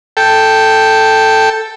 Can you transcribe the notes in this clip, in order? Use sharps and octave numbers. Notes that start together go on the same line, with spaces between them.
A4 G5